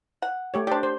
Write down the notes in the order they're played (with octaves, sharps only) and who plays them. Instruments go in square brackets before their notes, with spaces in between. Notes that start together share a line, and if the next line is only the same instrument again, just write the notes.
[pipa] F#5
[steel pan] A3 G4 C#5
[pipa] D4 G4 [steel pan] C5 D5
[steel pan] C5